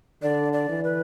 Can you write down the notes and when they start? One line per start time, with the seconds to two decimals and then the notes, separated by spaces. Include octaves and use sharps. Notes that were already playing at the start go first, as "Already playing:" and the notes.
0.22 D3 D5
0.53 D5
0.69 E3
0.84 B4